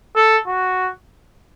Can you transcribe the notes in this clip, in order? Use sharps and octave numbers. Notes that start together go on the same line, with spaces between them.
A4
F#4